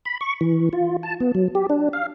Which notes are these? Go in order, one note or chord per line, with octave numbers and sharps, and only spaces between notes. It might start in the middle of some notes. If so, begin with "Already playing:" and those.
B5
C#6
E3
F4
A5
B3
F#3
G4
D4
F5